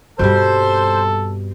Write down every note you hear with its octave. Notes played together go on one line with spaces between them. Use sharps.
G2 B2 G3 C4 A4 C5